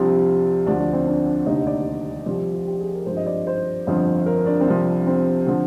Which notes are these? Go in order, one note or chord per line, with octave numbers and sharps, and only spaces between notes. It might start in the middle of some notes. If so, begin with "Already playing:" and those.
Already playing: C2 C3 F3 D4
D2 D3 F3 D4
D4
C4
D4
D4
F1 D#2 D3 D#4
D5
C2 C3 F3 D5
F4
G4
G#4
A#4
G#1 G2 F3 C5
D#5
D5
C5
G1 F2 D3 F3
A#4
D4
C4
C2 C3 F3 D4
C4
D3 F3